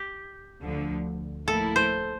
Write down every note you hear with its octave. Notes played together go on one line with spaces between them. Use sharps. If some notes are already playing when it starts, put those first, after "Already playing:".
Already playing: G4
D2 D3 F3
A2 F3 A#3 E4 A4
C5